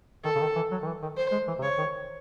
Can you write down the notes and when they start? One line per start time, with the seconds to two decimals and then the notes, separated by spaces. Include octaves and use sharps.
0.25 D#3 A4
0.35 C#3
0.41 D#3
0.55 E3
0.71 F#3
0.82 D#3
0.87 E3
1.02 D#3
1.17 C5
1.32 G#3
1.48 E3
1.58 C3
1.63 C#3 C#5
1.78 D#3